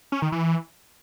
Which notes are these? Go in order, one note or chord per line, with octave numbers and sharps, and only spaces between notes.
C#4
D#3
E3